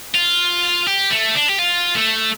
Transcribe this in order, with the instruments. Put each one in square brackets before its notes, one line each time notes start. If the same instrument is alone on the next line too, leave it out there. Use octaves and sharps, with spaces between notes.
[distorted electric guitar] F4
G4
A3
D4
G4
F4
A3